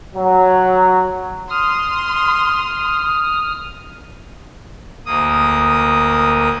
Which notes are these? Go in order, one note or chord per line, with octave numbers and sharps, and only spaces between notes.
F#3
C6 D#6 F6
D2 A#3 D#6